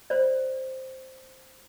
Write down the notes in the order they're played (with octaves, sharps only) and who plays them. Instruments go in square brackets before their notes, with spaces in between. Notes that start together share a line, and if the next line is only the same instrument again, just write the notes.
[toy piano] C5 D5